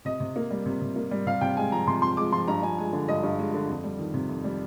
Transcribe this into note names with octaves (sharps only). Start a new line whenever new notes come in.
C3 D#5
C3
A#3
G3
C3
C3
A#3
G3
C3 F5
C3 G5
G#3 G#5
F3 A#5
C3 C6
C3 C6
G#3 D6
F3 C6
G2 A#5
G2 G#5
G#3 G#5
D3
G2 D#5
G2
G#3
D3
F2
G3
D#3
C3
F2
G3